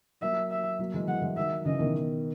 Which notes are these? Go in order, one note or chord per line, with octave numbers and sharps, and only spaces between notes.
F#3 A#3 E5
E5
F#3 A#3
E3 G#3
E3 G#3 F#5
E3 G#3
D#3 F#3 E5
C#3 E3 D#5
B2 D#3